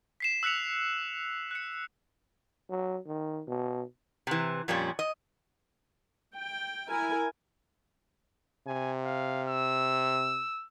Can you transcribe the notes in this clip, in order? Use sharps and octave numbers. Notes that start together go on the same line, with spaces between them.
B6 C7 E7
E6 F#6 B6 C#7 F7
F#6 C#7
F#3
D#3
B2
C3 E3
F2 A#2 G3 C#4
D#5
G5
E4 A#4 G#5
C3 G#5
F5
E6